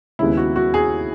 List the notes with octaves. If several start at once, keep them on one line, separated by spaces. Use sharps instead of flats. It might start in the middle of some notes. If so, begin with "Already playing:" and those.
D#2 C#3 G#3 B3 E4
F#4
F#4
G#4